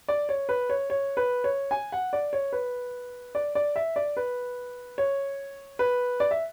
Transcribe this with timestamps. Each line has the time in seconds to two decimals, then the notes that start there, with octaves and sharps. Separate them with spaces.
0.08 D5
0.29 C#5
0.49 B4
0.70 C#5
0.90 C#5
1.17 B4
1.44 C#5
1.71 G#5
1.92 F#5
2.13 D5
2.33 C#5
2.53 B4
3.35 D5
3.55 D5
3.76 E5
3.96 D5
4.17 B4
4.98 C#5
5.79 B4
6.20 D5
6.31 E5